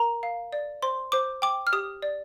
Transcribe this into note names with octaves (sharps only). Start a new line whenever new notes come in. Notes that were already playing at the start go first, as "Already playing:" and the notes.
Already playing: A#4 A#5
F5
D5
C5 C6
C5 D6
G5 D6
F6
G4 D#6
D5